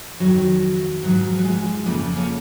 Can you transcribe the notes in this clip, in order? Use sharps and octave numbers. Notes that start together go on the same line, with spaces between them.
F2 D#3 F#3
G#2 F3 F#3
F#3
G#3
F2 C#3 F3 A#3
C#4